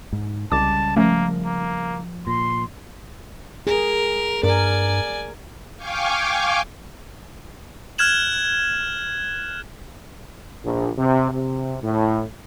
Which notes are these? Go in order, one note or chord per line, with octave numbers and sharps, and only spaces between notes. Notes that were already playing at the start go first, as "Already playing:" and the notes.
G#2
C2 C#3 G3 G#3 A5 D6
F3 A3 A#3 C#4 A#4
A#3
A#2 C6 A#6
G#4 A#4
G2 A#4 D5 G#5
F5 G5 G#5 C#6 D6
F6 F#6 G#6 E7 F#7
A#1
C3
C3
A2